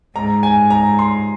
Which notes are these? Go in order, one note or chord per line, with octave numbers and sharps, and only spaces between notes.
G#2 A#5
G#5
A#5
C6